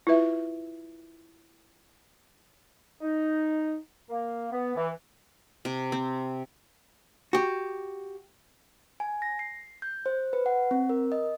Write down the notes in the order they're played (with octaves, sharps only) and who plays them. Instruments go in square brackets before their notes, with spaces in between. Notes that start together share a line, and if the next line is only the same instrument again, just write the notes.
[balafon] E4 F4 B4 E5
[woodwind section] D#4
A#3
B3
E3
[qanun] C3
C4
[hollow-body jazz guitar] F#4 G4
[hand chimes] G#5
A#6
C7
G6
C5
B4
F#5
C4
A#4
D#5